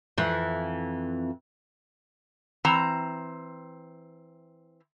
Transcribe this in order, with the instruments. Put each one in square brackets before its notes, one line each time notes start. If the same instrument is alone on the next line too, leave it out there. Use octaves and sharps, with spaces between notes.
[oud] F2 E3
[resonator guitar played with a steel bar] E3 C4 A#5